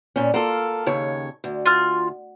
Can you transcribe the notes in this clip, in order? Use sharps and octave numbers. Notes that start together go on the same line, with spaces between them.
A#2 C#4
A#3 F4 A4
D#2 C#3 C#5
D2
F4 F6